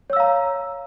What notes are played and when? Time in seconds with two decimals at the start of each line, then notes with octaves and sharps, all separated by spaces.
0.10 C#5
0.13 E6
0.16 F5
0.20 A#5